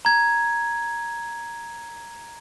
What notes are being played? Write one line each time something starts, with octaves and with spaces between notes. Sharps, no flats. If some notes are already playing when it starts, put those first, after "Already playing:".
A#5 G#6